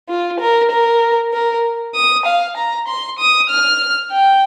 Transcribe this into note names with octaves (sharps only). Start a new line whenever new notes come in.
F4
A#4
A#4
A#4
D#6
F5
A#5
C6
D#6
F6
G5